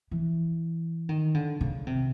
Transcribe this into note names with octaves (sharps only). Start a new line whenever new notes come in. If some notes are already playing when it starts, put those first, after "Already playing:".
E3
D#3
D3
C#3
C3